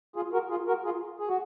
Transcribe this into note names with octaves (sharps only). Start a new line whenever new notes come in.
F4 G#4
F#4 A#4
F4 G#4
F#4 A#4
F4 G#4
G#4
F#4